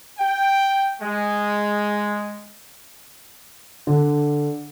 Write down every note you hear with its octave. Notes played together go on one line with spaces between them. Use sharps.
G5
G#3
D3